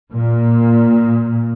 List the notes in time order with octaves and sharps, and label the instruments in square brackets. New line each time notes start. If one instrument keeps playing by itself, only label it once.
[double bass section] A#2